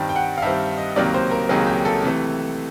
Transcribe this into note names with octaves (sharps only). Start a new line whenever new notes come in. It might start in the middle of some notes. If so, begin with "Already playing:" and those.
Already playing: G2 D#3 G3 C4
G5
F#5
F5
G2 D#3 G3 C4 E5
D#5
C#2 C3 D#3 F#3 A#3 D5
C5
A#4
C#2 C3 D#3 F#3 A#3 G#4
G4
A4
C3 E3 A3